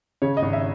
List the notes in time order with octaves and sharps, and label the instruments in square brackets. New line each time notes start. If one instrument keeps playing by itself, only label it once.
[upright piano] C#3 C#5
D#5
G#1
E5